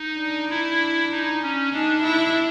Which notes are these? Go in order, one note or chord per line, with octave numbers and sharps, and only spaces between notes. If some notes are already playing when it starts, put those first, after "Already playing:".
Already playing: D#4
D4
E4
D#4
C#4
D4 D#4
E4